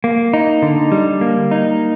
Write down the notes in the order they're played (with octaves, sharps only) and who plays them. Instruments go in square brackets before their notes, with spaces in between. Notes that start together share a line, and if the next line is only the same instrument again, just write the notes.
[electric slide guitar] A#3
D#4
D3
G3
A#3
D#4